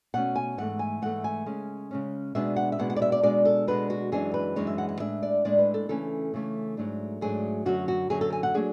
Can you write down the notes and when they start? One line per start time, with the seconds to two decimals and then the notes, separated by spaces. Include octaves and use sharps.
0.14 B2 A3 C#4 F#5
0.36 G#5
0.58 G#2 E3 A3 F#5
0.79 G#5
1.02 G#2 E3 A3 F#5
1.24 G#5
1.46 C#3 G#3 C#4
1.91 C#3 G#3 C#4
2.35 B2 G#3 B3 D4 E5
2.56 F#5
2.72 E5
2.79 B2 G#3 B3 D4 F#5
2.90 F#5
2.96 D5
3.02 E5
3.12 D5
3.23 B2 G#3 B3 D4 D5
3.45 A4
3.68 B2 G#3 B3 D4 B4
3.90 F#4
4.12 F#2 E3 G#3 D4 G#4
4.34 B4
4.56 F#2 E3 G#3 D4 C#5
4.67 E5
4.78 F#5
4.89 F#5
5.00 A2 G#3 D4 E5
5.23 D5
5.45 A2 G#3 D4 D5
5.59 B4
5.74 A4
5.89 C#3 E3 A3 C#4 A4
6.34 C#3 E3 A3 C#4
6.77 G#2 F#3 A3 D4
7.21 G#2 F#3 A3 D4 G#4
7.66 F#2 D3 F#3 F#4
7.88 F#4
8.10 F#2 D3 F#3 G#4
8.21 A4
8.33 G#5
8.43 F#5
8.54 F#3 A3 D4 G#4